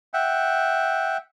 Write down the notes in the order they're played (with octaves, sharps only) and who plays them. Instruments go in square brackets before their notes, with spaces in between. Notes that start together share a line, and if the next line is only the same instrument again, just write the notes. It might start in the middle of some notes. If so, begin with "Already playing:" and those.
[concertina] E5 F#5 G5